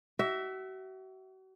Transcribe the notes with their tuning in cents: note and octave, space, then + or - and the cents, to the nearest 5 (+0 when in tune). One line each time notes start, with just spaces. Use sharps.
F#4 +40 E5 +0